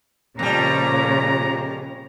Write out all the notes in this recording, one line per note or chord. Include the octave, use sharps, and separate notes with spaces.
F2 A#2 C#3 G3 A#5